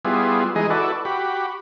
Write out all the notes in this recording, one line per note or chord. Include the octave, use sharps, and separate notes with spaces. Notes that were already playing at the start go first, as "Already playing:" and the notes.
G3 B3 E4 F4 G#4
E3 G#3 D#4 G#4 D#5
E4 F#4 A4 B4 D5
F#4 G4 B5